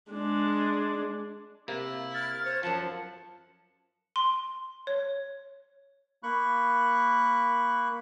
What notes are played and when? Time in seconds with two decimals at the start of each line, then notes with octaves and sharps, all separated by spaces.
0.12 G#3 D4
1.68 C3 A#3 E4
2.14 F6 A6
2.45 C5 C#5
2.63 F#2 F3 F#5 A5
4.16 C6
4.87 C#5
6.23 A#3 B5 C#6 F#6